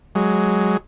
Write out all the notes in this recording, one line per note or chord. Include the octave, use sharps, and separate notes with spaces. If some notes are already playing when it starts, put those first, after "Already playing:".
F#3 G#3